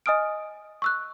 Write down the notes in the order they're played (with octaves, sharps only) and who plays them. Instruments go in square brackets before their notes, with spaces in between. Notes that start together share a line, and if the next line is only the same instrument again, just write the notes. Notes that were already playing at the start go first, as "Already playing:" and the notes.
[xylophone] D#5 G#5 D#6 F6 D7
C#6 E6 F#6